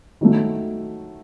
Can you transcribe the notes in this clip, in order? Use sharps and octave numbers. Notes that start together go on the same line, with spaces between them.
D#3 F#3 A3